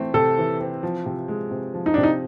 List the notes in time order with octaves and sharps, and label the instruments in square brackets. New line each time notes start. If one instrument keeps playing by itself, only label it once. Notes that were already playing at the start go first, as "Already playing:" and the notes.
Already playing: [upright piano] E3 A3 C4
[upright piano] C3 [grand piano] A4
[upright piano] E3
C4
F3
C3
G#3
C3
F3
[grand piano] D#4
[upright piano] C3 [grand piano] D4
[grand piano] D#4